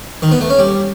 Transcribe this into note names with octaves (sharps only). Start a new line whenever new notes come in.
D#3
B3
A3
C#4
G3